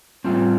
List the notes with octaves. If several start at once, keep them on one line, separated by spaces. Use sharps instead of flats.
A2 G3 C4 F4